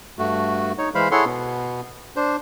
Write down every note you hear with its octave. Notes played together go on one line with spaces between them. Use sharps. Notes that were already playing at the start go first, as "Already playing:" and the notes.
G2 A3 F#4
D#4 C#5
E3 G#3 C5 F5 B5
E4 G#4 A4 C#5 F#5 C6
B2 B3
D4 C5